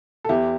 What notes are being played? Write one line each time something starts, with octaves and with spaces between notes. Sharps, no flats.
A4
E2 E4 G4